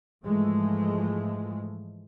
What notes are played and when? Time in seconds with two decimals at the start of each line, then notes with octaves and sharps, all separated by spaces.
0.24 G#2 E3 F3 G#3 A3